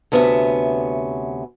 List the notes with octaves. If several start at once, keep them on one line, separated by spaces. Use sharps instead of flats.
D2 C3 B3 C#4 F4 E5